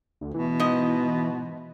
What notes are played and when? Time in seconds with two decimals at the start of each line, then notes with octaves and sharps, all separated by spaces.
0.21 D2
0.34 B2 E3
0.60 G#2 D#5